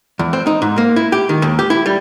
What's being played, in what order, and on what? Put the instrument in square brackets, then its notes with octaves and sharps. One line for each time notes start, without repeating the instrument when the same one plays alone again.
[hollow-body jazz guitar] E2
C4
D#4
G#2
A#3
E4
G4
D#3
D#2
G4
E4
G3